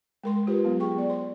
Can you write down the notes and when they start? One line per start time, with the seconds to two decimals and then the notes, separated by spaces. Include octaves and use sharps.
0.24 G#3 A#4 C6
0.47 F4 G4 B4 C5
0.65 F#3 B3
0.79 G#4 G5 C#6
0.97 B3 D5
1.10 C5 C6